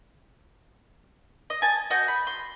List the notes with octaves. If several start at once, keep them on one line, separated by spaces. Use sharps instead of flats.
D#5
G#5 A5
F#4 D#5 G6
B5
C6